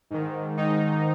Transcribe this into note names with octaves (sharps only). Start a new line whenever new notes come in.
G#2 D#3
G#2 D#3 D#4